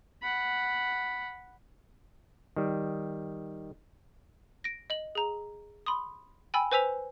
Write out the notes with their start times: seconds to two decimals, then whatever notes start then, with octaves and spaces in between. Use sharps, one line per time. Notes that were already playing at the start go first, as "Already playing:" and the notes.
0.22 F#5 B5
2.56 D#3 G3
4.64 A#6 D7
4.90 D#5 F#7
5.15 G#4 A#5
5.86 B5 C6 D#6
6.54 G5 G#5 B5 E6
6.71 B4 C5 G#5 E6 B6 F7